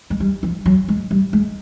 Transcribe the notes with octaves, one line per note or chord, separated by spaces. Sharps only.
G#3
G3
F3
F#3
G#3
G3
G#3